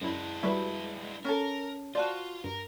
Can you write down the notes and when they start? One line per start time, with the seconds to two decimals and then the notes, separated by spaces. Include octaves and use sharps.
0.01 F#2 G#3 D4 E4
0.43 G3 E4 F#4 B4 E5
1.25 C#4 A4 A#4
1.95 F4 F#4 C5 D5 A5
2.44 G2 A#4